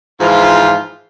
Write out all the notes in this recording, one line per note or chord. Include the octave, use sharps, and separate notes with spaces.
G#2 E3 F3 F4